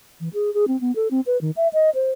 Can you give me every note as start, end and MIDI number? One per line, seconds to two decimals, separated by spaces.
0.21 0.29 52
0.34 0.53 68
0.54 0.65 68
0.68 0.79 60
0.81 0.94 59
0.96 1.08 69
1.11 1.21 60
1.26 1.40 71
1.41 1.51 51
1.57 1.68 76
1.73 1.90 75
1.95 2.11 72